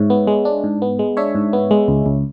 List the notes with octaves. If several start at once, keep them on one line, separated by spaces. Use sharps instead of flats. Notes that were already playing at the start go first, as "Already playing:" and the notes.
Already playing: G#2 C#5 E5
B3
G#3
D4
G#2
B3
G#3
D4 C#5 E5
G#2
B3
G#3
C#2
C#2